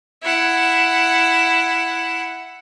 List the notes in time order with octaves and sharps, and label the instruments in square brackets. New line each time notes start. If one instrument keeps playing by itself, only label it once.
[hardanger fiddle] E4 F#5